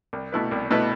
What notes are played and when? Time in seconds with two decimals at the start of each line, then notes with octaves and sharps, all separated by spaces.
0.13 C2
0.32 B2 A3 E4 B4
0.51 C2
0.71 B2 A3 E4 B4